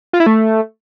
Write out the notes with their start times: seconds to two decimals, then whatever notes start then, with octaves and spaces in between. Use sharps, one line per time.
0.13 F4
0.20 E4
0.26 A3